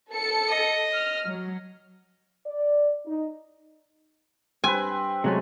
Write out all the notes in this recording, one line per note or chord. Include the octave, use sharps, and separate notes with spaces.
A4 C#7
D#5
F6
F#3
D5
D#4
G2 C4 B4 G#5
C3 F#3 G#3 A3 C#4